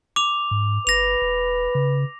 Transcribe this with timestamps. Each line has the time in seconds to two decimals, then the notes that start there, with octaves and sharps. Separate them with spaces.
0.16 D6 F7
0.51 G#2
0.87 G1 B4 A#6 F7
1.22 E1
1.75 C#3